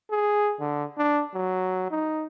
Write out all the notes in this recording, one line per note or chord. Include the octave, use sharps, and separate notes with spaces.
G#4
D3
D4
F#3
D#4